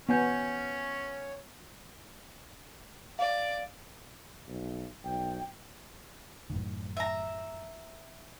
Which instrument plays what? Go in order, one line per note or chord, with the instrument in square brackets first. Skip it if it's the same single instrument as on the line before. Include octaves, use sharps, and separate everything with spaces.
[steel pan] B3 [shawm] C#4 [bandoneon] C#5 [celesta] F#5 G#5 G6
[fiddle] D5 [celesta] F5
[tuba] B1
[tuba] B1 [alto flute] G5
[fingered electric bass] F#2 A2 D#3
[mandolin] E5 A#5